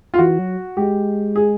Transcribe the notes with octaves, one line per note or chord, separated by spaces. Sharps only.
F4
E3 F#4
F#3
G#3 G4
G#4